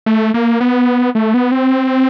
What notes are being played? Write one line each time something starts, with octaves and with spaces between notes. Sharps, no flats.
A3
A#3
B3
A3
B3
C4